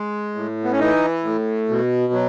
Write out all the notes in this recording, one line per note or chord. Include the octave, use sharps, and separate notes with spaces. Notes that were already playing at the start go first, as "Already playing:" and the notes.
Already playing: G#3
A2
B3
C#4
E3 D#4
A2
B2
F#3